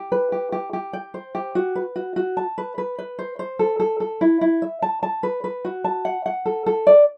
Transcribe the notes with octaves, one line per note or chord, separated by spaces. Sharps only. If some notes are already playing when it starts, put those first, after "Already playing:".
Already playing: G4
B4
G4
G4
G4
G5
C5
G4
F#4
B4
F#4
F#4
A5
B4
B4
B4
C5
C5
A4
A4
A4
E4
E4
E5
A5
A5
B4
B4
F#4
A5
F#5
F#5
A4
A4
D5